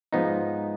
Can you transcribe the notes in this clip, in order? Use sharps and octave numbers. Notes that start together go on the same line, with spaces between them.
G#2 F3 B3 D#4